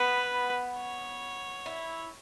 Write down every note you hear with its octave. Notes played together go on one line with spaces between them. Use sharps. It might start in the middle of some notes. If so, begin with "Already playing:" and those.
Already playing: B3 B4
C#5
E4